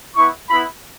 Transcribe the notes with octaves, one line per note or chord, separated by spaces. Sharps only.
B3 E4 C#6
B3 E4 B5